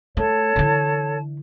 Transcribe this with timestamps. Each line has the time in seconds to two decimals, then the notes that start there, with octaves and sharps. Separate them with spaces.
0.17 A3 A4 C#5 A5
0.56 D3 E3